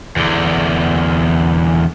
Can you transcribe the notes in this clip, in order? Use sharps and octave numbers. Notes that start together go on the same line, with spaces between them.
E2 D3